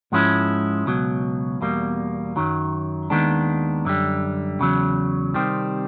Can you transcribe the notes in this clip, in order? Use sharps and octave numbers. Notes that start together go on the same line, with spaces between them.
G#2 F3 G#3 C#4 E4
C#2 B2 F#3
E2 B2 G3 A#3
F#2 D#3 F#3
D#2 D#3 G#3 B3 D4
F#2 D3 G3
E2 C#3 F#3
C3 D#3 G3 C4